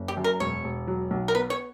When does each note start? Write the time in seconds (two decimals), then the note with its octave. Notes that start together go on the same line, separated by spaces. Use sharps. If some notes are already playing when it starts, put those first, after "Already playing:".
Already playing: F#1
0.08 G4
0.17 F#2
0.24 A#4
0.40 E1 C#5
0.64 E1
0.87 F#3
1.11 B1
1.28 A#4
1.34 B3 B4
1.50 C#5